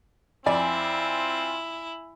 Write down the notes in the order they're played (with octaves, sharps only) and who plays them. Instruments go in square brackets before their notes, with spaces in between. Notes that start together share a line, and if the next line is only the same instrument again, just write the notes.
[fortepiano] F2 D5 [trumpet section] C4 F4 [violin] E4 [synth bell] G#5